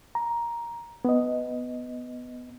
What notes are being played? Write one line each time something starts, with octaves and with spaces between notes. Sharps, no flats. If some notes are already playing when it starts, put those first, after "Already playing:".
A#5
B3 D#5